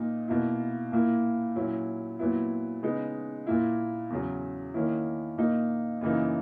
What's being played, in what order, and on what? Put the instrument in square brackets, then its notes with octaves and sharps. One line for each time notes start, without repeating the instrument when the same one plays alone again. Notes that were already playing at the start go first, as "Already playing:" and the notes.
Already playing: [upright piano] A#2 A#3 D#4
B2 A#3 E4
A#2 A#3 E4
A#2 F#3 C#4 E4
A#2 F#3 B3 E4
C#3 G#3 B3 D#4
A#2 A#3 E4
E2 C#3 F#3
D#3 A#3 C#4 E4
A#2 A#3 D#4
F#2 C#3 E3 A#3 D#4